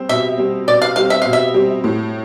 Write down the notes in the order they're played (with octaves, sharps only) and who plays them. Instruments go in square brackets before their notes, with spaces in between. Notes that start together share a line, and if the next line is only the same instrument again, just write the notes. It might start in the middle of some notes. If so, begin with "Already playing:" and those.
Already playing: [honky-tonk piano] G3 C4
[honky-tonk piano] B2 [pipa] E5
[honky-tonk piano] G3 C4
[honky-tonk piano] B2 [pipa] D5
[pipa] F5
[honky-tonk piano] G3 C4 [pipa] F5
[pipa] E5
[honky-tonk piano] B2 [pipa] F5
[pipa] E5
[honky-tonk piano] G3 C4
A2